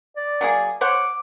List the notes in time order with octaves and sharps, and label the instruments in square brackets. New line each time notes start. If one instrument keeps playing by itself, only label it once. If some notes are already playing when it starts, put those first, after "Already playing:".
[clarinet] D5
[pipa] F#3 A#3 G#4
[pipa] C5 C#5 F#5 [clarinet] D6